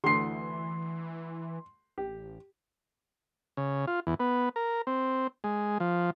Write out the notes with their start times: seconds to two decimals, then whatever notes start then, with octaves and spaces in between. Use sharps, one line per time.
0.04 D2 D3 E3 C6 C7
1.98 A1 G4
3.57 C#3
3.87 F4
4.07 E2
4.20 B3
4.56 A#4
4.87 C4
5.44 G#3
5.80 F3